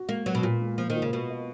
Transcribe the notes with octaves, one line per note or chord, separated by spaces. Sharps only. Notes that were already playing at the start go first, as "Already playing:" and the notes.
Already playing: F#4
G#3 A#3
F#3 B3
B2
A#2 F4
G#3
F3 A#3
D#3
F4
C#3
B2 B4
D#5